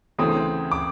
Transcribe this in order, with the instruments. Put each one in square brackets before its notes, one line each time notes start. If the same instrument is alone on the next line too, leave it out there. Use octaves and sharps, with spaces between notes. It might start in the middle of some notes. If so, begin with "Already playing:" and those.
[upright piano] D2 C#3 E3 A3 C4 [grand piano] D#6
[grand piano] D6